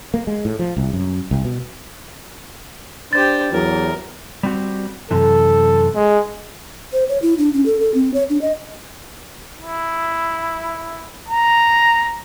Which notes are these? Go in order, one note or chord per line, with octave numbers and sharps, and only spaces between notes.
A#3
G#3
A2
F3
C2
F#2
C2
B2
D4 G4 C5 A6
E2 F#3 A#4
G3 C4 F#4
F#2 C3 E3 A4
G#3
C5
C#5
E4
D4
C#4
A4
A4
C4
C#5
D4
D#5
E4
A#5